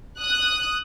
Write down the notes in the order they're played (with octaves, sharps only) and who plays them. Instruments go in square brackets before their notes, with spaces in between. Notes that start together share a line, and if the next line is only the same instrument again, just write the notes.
[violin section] D#6 F#6